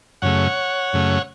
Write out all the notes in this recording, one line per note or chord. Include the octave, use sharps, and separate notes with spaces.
F#2 C#3 A3 C#5 F#5
F#2 C#3 A3